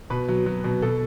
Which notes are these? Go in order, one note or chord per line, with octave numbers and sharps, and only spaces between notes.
B2 B4
F#3
F#3
B2
B2 A4